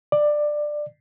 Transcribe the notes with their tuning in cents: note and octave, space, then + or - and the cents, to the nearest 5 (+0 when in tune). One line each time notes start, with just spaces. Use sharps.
D5 +15